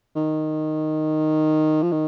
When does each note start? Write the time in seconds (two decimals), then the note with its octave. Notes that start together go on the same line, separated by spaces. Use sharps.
0.16 D#3
1.82 F3
1.92 D#3